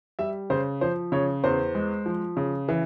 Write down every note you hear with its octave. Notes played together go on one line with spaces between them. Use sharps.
G3 E5
C#3 C5
F3 C5
C#3 C#5
E2 C5
G#3
F3
C#3
E3